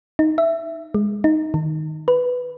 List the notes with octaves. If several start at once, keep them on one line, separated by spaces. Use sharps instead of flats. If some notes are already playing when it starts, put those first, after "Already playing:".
D#4
E5
G#3
D#4
D#3
B4